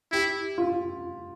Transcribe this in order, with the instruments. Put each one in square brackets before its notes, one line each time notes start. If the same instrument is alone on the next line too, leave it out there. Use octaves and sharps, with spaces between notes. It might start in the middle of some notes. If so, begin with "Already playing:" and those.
[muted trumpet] E4 [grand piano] G4
[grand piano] F4